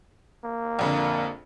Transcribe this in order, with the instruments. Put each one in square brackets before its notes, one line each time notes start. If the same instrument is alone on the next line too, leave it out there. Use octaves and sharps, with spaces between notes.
[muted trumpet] A#3
[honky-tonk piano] A#1 F2 D3